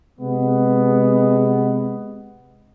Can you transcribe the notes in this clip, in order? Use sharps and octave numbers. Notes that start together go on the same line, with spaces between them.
C3 G#3 B3